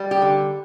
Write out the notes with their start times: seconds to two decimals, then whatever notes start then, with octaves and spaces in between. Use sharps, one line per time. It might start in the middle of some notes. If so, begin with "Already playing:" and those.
Already playing: G3
0.11 G4
0.22 D3